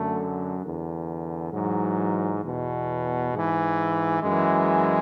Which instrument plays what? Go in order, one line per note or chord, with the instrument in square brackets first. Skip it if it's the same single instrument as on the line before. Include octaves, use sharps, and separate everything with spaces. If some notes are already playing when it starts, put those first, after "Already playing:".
Already playing: [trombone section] F#2 D3 A3
E2 D3
G#2 E3 F#3
E2 B2
G#2
E3
F#2 E3 G#3